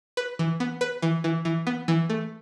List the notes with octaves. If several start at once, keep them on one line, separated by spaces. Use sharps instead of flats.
B4
E3
B3
B4
E3
E3
E3
B3
E3
A3